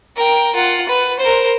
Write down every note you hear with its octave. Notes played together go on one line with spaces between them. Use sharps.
A#4 G5
F4 F#5
B4
A#4 C5